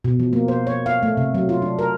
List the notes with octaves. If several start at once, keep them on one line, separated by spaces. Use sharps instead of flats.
B2
F3
A#3
C5
C#5
F5
A3
C3
F#3
F4
D4
A#4